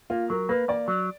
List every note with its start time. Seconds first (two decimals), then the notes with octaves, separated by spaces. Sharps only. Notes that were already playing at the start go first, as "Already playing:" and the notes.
0.10 A#3 F4
0.30 F#3 A#4
0.49 A#3 B4
0.68 A#3 D5
0.88 F#3